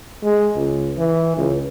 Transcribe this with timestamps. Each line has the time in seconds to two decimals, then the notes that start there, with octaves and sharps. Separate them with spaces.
0.24 G#3
0.56 C#2
0.98 E3
1.37 C#2